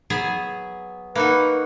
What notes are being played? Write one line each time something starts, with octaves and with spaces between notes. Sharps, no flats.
F#3 B3 G#4
A#3 D#4 F#4 B4